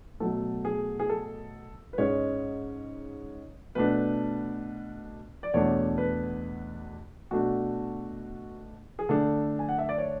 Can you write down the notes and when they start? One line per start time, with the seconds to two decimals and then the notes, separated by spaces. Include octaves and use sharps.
0.20 B2 F#3 A3 A4
0.65 G#4
0.99 G#4
1.09 A4
1.93 B4
1.98 G#2 G#3 C#4 C#5
3.75 B2 A3 D4 B4
5.43 D5
5.54 E2 B2 A3 D4 C#5
5.98 B4
7.31 B2 A3 D4 F#4
8.99 G#4
9.09 D3 A3 D4 A4
9.59 G#5
9.69 F#5
9.78 E5
9.89 D5
9.98 C#5